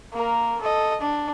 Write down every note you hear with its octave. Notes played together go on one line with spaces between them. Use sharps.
A#3 A#4
A4 D#5
D4